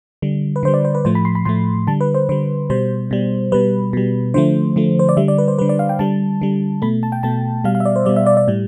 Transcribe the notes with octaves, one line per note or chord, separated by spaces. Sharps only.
D3 G3
B4
D3 G3 C5
D5
C5
B4
A2 F3 A3 C5
B5
C6
B5
A2 F3 A3 C6
D3 G3 A5
B4
C5
D3 G3 C5
B2 G3 C5
B2 G3
B2 G3 B4
B2 G3
D3 F3 A3 C5
D3 F3 A3
C5
D5
D3 G3 E5
D5
B4
C5
D3 G3 B4
D5
F5
G5
D3 G3 A5
D3 G3
B2 A3 B5
A5
G5
B2 A3 A5
B2 G3 F5
F5
E5
D5
C5
B2 G3 D5
E5
D5
D5
A2 G3